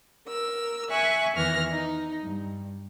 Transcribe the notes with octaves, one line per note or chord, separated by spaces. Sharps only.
A#4 E6
E5 G#5 C#6 F#6
E2 D#3 E3 F6 A#6
D#4
G2